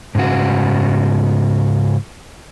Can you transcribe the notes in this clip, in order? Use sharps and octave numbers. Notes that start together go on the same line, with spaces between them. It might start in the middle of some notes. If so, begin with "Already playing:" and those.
G#2 C#3 F#4